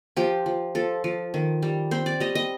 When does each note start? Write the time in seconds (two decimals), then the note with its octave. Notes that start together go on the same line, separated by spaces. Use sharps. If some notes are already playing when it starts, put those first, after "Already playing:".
0.17 F3 G4
0.46 F3
0.75 F3 A4
1.04 F3
1.34 D#3
1.62 G3
1.91 C4 C5
2.06 D5
2.20 G3 D#5
2.35 D#5